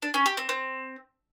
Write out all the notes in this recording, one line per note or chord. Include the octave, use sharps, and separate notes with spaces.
D4
C#4
G4
C4
C4